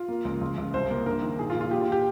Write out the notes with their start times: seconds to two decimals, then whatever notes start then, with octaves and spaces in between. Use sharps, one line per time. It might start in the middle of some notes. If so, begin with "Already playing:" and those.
Already playing: F4
0.08 A#3
0.25 C#2
0.41 C#2
0.57 C#2
0.74 C2 C5
0.90 A#3
1.06 G2 A#4
1.22 D#3
1.39 A#2 G#4
1.50 F4
1.55 A#2
1.61 F4
1.71 A#2 G4
1.81 F4
1.92 G4